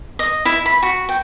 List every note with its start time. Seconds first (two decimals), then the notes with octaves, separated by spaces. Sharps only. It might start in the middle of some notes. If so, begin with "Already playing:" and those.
0.19 D#5
0.45 E4
0.66 B5
0.83 F#4
1.09 G5